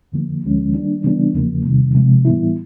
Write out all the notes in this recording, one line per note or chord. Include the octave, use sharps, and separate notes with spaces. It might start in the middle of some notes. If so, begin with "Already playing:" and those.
F2 D3 F3 A#3
D2 D3 F3 G#3 C#4
D#3 G3 A#3 D4
C#3 E3 G3 B3 D4
E2 C#3 F3 A#3
E2 C3 D#3 G3
C3 F3 G#3
A2 E3 G3 B3 E4